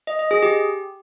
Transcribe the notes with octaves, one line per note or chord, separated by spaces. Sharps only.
D#5
D#5
G#4
G4